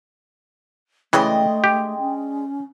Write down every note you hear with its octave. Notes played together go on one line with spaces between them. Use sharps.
C#3 E3 G#3 A3 D4 D#5 G5
G4
C#4